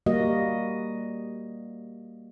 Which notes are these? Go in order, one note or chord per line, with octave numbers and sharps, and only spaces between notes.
G3 A#3 F#4 D#5